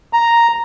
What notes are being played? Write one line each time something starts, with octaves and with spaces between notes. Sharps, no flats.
A#5